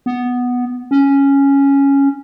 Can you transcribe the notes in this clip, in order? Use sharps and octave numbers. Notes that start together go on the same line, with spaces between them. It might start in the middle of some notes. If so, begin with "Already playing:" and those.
B3
C#4